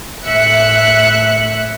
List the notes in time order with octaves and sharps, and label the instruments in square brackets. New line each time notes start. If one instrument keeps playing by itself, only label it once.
[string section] A2 E5 F#6 C#7